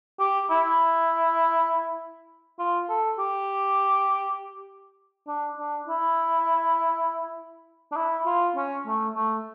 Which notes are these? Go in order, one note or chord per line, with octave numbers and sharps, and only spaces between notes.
G4
E4
F4
A4
G4
D4
D4
E4
D4
E4
F4
C#4
A3
A3